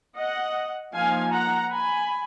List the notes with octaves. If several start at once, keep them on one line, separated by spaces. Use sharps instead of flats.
D#5 F#5
F3 A#3 D#4 F5 G#5
F#5 A#5
G#5 B5